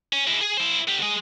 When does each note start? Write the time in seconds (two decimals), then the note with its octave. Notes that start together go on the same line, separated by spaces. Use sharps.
0.13 C#4
0.27 G#3 E4
0.41 G#4 G#5
0.57 E4 C5
0.88 D3 G4
1.02 G#3 D#5